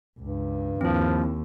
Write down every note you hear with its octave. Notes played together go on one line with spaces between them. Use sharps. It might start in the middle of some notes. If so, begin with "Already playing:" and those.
C#2 G2
D#2 F3 C4 E4